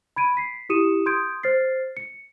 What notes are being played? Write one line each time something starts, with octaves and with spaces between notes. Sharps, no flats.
B5 G#6 D7 D#7
B6 C7
E4 G4 D#6 C#7 D#7 E7
C6 D#6 G6 G#6 D7
C5 F6 A6 C7
C#7